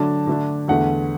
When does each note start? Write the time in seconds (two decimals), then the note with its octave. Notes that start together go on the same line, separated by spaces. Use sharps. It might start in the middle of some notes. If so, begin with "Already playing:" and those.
Already playing: D3 F#3 A3 D4 A5
0.27 D3 A3 D4
0.68 E2 D3 A3 F#5